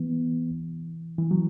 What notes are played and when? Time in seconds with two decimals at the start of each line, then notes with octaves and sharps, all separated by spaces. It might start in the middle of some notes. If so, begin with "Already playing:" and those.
Already playing: E3 B3
1.18 E3
1.31 F#3